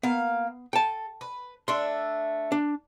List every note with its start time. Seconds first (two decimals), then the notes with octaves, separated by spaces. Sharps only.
0.03 A#3 B3 F5
0.73 A4 G5 A5
1.21 B4
1.68 A3 D4 E5 C6
2.52 D4